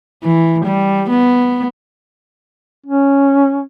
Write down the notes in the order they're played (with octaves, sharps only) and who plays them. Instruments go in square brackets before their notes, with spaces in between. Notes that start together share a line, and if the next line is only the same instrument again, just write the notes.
[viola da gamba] E3
G3
B3
[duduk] C#4